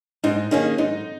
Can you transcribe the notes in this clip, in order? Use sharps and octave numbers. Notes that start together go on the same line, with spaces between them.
G#2 D#4
D#3 A#3 C#4 D#4 G#4
G#2 D#4